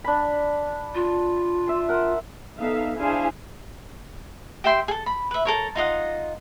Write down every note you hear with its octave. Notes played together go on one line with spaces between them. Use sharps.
D4 B5
F4
E5 C6
A#4 F#5
B3 D#4 A4 E5 F5
D4 E4 G#4 C5 F5 G#5
G4 E5 G5 C6
G#4 A4
B5
B4 E5
A4 A#4 C#5
D#4 F4 D#5 F#5